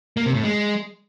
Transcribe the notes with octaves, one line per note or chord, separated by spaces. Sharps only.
A#3
C3
A2
G#3